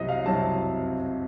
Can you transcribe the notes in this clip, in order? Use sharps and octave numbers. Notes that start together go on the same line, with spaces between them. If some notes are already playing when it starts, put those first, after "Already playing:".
Already playing: C2 C3 F#3 C4 D#5
F5
C2 C3 F#3 C4 A5